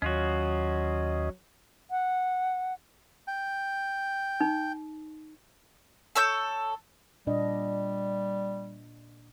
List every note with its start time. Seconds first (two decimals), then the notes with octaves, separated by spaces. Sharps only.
0.02 D#2 F#3 C#4 F4 F#4 D#5
1.91 F#5
3.27 G5
4.40 D#4
6.15 A4 C#5 E6 G6
7.27 A#2 G3 D4 D#5